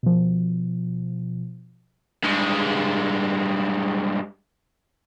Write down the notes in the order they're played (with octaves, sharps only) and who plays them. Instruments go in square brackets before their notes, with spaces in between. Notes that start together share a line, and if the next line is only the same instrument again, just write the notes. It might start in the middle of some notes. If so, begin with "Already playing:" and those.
[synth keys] B2 F3
[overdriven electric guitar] G2 G#3